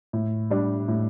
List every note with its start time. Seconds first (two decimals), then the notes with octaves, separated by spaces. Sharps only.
0.13 A2
0.50 G3 D4
0.88 A2